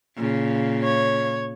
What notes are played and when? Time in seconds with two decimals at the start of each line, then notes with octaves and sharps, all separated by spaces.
0.16 A#2 C#3
0.83 C#5